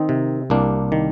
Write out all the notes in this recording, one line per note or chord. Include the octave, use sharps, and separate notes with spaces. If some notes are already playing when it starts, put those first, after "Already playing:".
Already playing: D#3 C4 D#4
C3
C2 A#3 D4
D#3